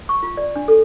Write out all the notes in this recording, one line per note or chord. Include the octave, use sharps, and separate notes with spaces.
C#6
F4
D5
D4
A4